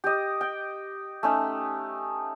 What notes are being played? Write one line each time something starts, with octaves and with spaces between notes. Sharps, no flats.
G4 D#5
G5
A3 C#4 D#4